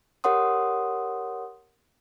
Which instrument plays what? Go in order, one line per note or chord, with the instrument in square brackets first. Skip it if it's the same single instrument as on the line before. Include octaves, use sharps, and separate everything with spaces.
[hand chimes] G4 A#4 C#5 F#5 C6 D#6